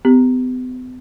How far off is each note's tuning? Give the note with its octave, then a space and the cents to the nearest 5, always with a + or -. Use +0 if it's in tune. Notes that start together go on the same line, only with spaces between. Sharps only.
B3 +45 G4 +0